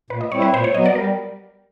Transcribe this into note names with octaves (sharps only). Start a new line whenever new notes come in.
A#2 B4
D#5
G3 C4 E4 C#5
B4
A#2 C5
C#5
F#3 B3 D#5
D5
G3 A#4